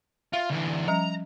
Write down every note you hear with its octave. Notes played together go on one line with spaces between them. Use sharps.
F4 E5
D2 E3
F3 G3 C#4 A#5